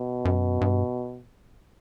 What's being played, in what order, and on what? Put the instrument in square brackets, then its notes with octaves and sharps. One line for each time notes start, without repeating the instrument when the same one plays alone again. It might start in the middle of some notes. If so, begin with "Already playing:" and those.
Already playing: [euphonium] B2
[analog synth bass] F#2
G2